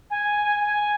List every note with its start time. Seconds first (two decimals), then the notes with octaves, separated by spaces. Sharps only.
0.10 G#5
0.60 G#5